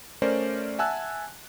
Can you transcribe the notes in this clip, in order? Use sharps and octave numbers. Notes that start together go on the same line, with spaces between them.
A3 C#4 A#4 C5 D5
E5 F#5 G#5 A5 E6 F#6